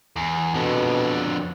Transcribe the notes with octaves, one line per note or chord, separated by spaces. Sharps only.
E2
F2 B2 D3